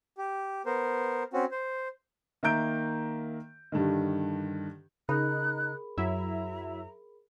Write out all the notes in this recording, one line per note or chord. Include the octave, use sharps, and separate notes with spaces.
G4
B3 A#4 C5
C4 C#4 F#4
C5
D#3 A#3 E5 A#5 G6 D7
G2 D3 D#3
C#3 D#4 G#4 A#4 B5 F#6
F#2 F#3 E4 E5 A#5